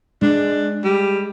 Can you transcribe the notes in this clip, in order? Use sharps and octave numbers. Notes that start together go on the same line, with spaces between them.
G#3 D4
G3